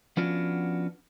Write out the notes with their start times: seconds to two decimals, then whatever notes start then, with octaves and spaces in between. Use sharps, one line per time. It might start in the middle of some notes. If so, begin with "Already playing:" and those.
0.17 F3 B3 C#4 D4 F4 F#4